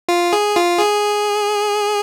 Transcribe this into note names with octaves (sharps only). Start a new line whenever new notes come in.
F4
G#4
F4
G#4